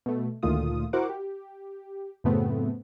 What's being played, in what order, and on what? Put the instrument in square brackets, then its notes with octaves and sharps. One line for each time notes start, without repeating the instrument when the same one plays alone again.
[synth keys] B2 A3
D2 A#2 D#3 A3 F4 D#6
E4 F#4 A#4 C5 F#5 D6
G4
F#2 A2 C#3 A3 B3 C4